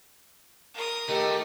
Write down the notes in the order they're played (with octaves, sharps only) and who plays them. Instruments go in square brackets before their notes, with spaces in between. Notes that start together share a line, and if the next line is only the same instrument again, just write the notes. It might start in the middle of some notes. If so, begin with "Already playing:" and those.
[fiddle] A#4 D#6
[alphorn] D#3 [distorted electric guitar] A3 A4 [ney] G4